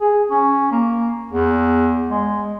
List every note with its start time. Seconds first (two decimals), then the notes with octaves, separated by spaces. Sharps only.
0.01 G#4
0.31 C#4
0.71 A#3
1.32 E2
2.09 G#3